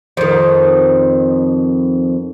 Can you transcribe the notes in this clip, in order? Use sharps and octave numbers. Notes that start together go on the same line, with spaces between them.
F2 D#3